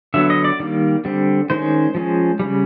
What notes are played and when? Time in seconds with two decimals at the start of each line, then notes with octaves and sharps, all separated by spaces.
0.14 D3 F#3 B3 E5
0.30 D#5
0.44 D5
0.60 D#3 G3 A#3
1.05 D3 G3 C4
1.50 D#3 G#3 C#4 C5
1.95 F3 G#3 C#4
2.40 C#3 E3 G3